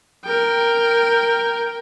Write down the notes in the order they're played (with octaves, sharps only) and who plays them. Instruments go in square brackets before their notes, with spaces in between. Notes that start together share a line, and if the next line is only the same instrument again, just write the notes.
[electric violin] A#4 G5